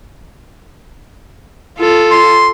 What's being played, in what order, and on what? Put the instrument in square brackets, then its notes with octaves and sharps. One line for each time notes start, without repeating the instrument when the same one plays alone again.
[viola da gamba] F4 A4
[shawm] C6